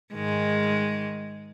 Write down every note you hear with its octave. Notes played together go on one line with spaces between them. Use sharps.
G#2 D#3 G#3